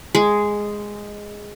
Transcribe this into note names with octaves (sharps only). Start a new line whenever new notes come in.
G#3